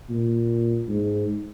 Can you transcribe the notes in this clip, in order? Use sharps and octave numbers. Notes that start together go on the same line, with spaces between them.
A#2
G#2